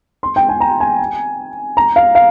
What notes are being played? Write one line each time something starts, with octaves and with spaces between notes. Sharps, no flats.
C6
G5
G#5
A#5
G#5
A#5
F5
F5